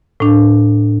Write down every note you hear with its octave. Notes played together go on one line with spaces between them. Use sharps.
A2 D4